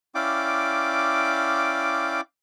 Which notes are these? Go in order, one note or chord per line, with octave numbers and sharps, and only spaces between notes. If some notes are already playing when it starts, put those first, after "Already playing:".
C#4 E4 D5 F5 G5 D6